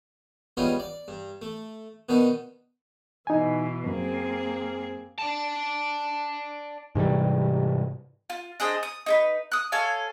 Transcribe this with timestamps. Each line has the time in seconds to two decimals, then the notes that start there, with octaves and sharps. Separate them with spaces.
0.57 C#2 G3 B3 C#4 D#4 F4
0.80 D5
1.08 G2
1.42 A3
2.09 B2 D#3 B3 D4 D#4
3.27 B2 E3 D#4 G#5
3.86 F#2 A#3 C4 G#4
5.18 D5 A5
6.95 G#2 C3 E3 G3
8.30 F4
8.60 D4 G#4 C5 D#5
8.83 D#6
9.06 D#4 G#4 B4
9.52 D#6 F#6
9.72 A4 C#5 F5 G#5